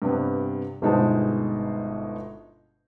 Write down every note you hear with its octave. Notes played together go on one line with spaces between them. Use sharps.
G2 C3 G3 B3
G1 B2 G#3 D#4 C5 A5